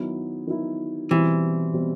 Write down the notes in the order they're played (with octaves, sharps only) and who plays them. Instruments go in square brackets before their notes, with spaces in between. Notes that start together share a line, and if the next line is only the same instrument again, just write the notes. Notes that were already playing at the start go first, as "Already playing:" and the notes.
Already playing: [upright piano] D#3 F#3 B3 E4
D#3 F#3 B3 E4
[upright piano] B2 G3 C4 [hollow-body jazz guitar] E3
[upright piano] B2 G3 C4